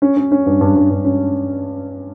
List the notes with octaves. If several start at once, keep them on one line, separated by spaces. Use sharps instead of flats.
C#4
C#4
C#4
G2
G2
G2
G2
C#4